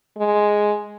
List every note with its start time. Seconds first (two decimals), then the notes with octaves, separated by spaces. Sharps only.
0.18 G#3